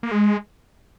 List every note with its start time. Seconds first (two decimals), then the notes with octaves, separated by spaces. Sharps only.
0.03 A#3
0.11 G#3